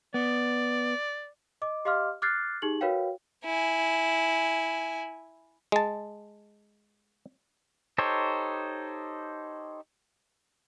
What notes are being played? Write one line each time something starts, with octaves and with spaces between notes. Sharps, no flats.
B3 D5
D#5 D6
G4 D#5 F5 C6 D6 F6
D6 F6 F#6 G#6 A6 C7
D#4 G4 G#4 F#7
F#4 A#4 B4 C#5 F5 G5
E4 G#5
G#3 A5
D#4 G4 A4 C5 C#5